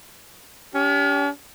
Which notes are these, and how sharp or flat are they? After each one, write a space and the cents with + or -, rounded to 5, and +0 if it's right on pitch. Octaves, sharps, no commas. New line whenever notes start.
C#4 +45 G4 +0